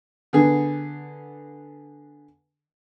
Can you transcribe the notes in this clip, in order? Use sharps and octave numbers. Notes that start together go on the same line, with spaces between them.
D3 B3 G#4